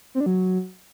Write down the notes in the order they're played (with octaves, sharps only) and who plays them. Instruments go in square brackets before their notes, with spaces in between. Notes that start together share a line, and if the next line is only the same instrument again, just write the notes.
[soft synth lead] C4
D4
F#3